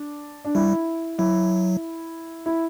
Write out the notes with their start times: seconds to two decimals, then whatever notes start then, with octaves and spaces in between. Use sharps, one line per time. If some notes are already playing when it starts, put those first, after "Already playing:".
Already playing: D4
0.45 D4
0.55 G3 E4
1.18 F#3 E4
2.46 E4